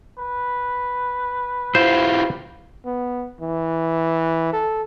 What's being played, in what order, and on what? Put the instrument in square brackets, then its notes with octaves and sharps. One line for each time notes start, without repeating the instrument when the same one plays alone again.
[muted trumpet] B4
[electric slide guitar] E4 F4 G4 [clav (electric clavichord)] C5
[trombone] B3
E3
A4